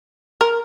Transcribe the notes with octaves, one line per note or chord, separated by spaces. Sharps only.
A#4